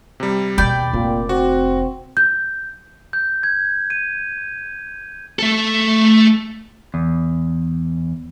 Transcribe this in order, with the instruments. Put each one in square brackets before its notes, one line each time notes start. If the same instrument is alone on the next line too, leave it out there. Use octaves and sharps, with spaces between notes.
[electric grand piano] C3 G3
[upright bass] D#2 B2 [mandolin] D5 G5 [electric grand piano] B5
[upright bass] F1 [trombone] A#2
[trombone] C4 [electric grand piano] F#4
[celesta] G6
[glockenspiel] G6
G#6
D#7
[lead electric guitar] A3 A4
[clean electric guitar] E2